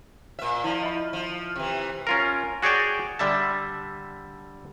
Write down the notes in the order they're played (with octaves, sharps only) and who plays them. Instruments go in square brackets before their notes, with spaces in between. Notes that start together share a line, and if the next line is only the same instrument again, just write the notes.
[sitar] A#2 E5 [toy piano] C5
[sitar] F3 [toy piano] E4 D5 F5
[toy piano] D#5 E5 B5
[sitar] F3
C3 E3
[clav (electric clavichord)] C#4 F4 A#4
F#4 G#4 C#5 D5 G5
D3 G3 E5 A5